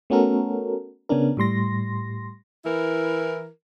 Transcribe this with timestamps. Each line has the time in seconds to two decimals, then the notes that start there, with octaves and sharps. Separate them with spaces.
0.10 A3 B3 C#4 F#4 A4 A#4
1.09 C#3 B3 C#4 D4 A#4
1.37 A2 G3 C6 A#6
2.64 E3 E4 A#4